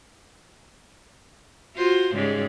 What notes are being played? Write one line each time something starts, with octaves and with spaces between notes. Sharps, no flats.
F4 F#4 C5
G#2 C#3 G3